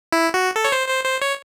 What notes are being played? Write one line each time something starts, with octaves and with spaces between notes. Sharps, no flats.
E4
F#4
A4
C#5
C5
C5
C5
C#5